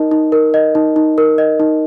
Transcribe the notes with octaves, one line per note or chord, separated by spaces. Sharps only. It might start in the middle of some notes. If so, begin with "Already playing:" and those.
Already playing: D#4 A#4 D#5
D#4
A#4
D#5
D#4
D#4
A#4
D#5
D#4